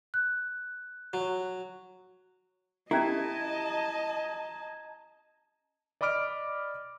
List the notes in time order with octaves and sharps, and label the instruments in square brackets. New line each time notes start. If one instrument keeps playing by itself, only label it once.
[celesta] F#6
[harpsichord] F#3
[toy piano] C#4 G4 [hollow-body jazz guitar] E4 [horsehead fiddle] D#5 A5 [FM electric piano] A#5 G#6
[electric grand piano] D5 D#5 B5 D6 F6 D7